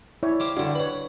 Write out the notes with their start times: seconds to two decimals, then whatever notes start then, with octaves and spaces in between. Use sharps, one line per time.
0.23 E4 C#5 D5
0.40 G4 C5 F5
0.57 G2 D3 D4 F#4
0.75 B4 C#5 F#5 B5